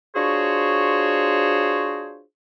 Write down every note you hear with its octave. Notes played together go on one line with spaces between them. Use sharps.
D4 F4 F#4 G#4 C5 C#5